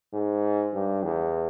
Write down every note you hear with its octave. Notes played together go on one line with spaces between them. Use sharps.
G#2
G2
E2